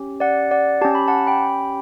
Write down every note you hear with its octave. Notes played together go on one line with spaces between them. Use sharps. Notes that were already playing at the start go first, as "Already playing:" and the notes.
Already playing: C#4 G4
D5 F#5
D5 F#5
C#4 G4 A5
B5
F#5 A5
G5 B5